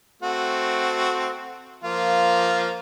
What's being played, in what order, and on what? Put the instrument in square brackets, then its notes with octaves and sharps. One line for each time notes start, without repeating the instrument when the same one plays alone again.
[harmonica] A3 C4 F#4
F3 A#3 F4